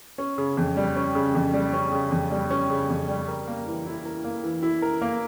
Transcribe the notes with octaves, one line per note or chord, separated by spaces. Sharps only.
C#4
C#3
F2
G3
C#4
C#3
F2
G3
C#4
C#3
F2
G3
C#4
C#3
F2
G3
A#4
A#3
E3
E4
A#4
A#3
E3
E4
A#4
A#3